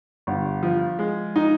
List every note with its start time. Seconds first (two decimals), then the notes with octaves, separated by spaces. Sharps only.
0.27 G1
0.63 F3
0.99 G#3
1.36 D#4